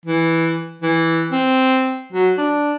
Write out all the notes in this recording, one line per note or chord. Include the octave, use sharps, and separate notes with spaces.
E3
E3
C4
F#3
D4